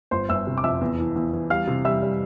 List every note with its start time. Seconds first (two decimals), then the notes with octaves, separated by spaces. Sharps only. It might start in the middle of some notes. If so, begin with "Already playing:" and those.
0.11 G1 C5 C6
0.29 G1 E5 E6
0.47 C3
0.58 D6
0.64 F2 E5 E6
0.81 E2
0.98 E3
1.16 E2
1.33 E3
1.50 G3 F5 F6
1.67 C3
1.85 G3 E5 E6
2.02 G3